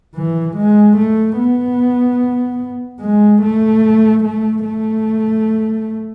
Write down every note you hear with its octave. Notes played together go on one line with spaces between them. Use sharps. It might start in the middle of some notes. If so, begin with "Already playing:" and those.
E3
G#3
A3
B3
G#3
A3
A3
A3